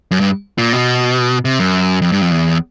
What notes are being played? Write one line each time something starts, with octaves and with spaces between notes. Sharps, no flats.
F#2
G2
A#2
B2
C3
F#2
F2
G2
F2
E2